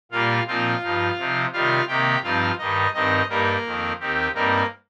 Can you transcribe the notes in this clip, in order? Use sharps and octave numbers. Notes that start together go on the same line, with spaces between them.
A#2 G3 A#3 F4 F5
A#2 F3 C4 D#4 F4 F5
G2 F3 D#4
C3 F3 C4 D#4
C3 D#3 G3 F4 F5
C3 D#3 A#3 G4 G5
G2 F3 C4 D#4 F4 F5
G2 D#3 G3 D#4 D#5
G2 D#3 C4 D#4 D#5
G2 G3 A#3 D#4 A#4
F2 D#3 C4
D#2 D#3 C4 D#4 G4
G2 G3 A#3 C4 D#4 A#4